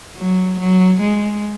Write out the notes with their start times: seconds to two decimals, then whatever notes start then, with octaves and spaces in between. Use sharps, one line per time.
0.18 F#3
0.60 F#3
1.01 G#3